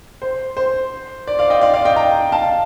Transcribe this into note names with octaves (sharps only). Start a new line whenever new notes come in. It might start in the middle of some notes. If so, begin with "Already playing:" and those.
C5
C5
D5
D5 F5
D#5 G5
D5 F5
D5 F5
D#5 G5
G5 A#5
F5 A5